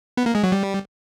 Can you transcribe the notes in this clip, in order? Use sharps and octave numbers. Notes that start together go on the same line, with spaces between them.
B3
A#3
G#3
F#3
G3